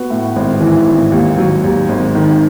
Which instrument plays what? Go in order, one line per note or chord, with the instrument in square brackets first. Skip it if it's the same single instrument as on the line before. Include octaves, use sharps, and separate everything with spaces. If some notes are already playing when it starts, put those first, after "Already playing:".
Already playing: [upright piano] B3 F#4
A2
G#1
E3
G#1
D#2
F#3
D#2
G#1
D#3